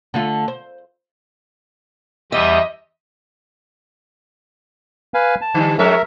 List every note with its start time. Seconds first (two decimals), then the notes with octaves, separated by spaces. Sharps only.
0.14 D3 A3 F4
0.48 C5
2.32 E2 G3 G4 D#5 E5
5.14 B4 F5 G#5
5.41 A5
5.54 D3 G3
5.79 F2 G#3 A#4 C#5 E5